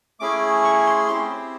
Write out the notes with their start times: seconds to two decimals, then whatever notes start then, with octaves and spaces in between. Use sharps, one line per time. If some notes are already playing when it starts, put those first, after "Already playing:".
0.20 A3 C#4 E4 G#4 D6
0.64 C#6
0.87 C6
1.08 C4 E4 G4 C6